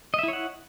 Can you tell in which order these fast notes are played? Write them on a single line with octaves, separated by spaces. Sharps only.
D#5 E5 E4 C#5 F#5